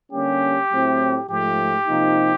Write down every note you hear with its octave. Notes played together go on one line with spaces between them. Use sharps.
D3 G3 A#3 C#4 G4
A2 F#3 A3 C4 E4
G#2 F3 A3 G4
C3 F3 A#3 D#4